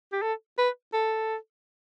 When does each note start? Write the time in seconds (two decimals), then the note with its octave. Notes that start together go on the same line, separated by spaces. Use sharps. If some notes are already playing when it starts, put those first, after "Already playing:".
0.12 G4
0.22 A4
0.58 B4
0.93 A4